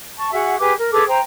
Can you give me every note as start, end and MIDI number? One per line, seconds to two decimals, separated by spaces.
0.17 0.30 81
0.17 0.30 85
0.32 0.54 66
0.32 0.54 68
0.32 0.54 76
0.32 0.54 78
0.58 0.72 67
0.58 0.72 68
0.58 0.72 71
0.58 0.72 86
0.78 0.89 70
0.91 1.04 68
0.91 1.04 69
0.91 1.04 71
0.91 1.04 86
1.07 1.18 72
1.07 1.18 79
1.07 1.18 82